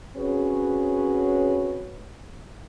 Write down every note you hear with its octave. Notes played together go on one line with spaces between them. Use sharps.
C4 C#4 F#4 G#4 B4 C#5